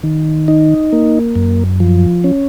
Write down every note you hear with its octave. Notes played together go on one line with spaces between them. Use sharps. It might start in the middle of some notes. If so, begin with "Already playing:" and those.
D#3
D#4
A#3
F#2
F3
C#4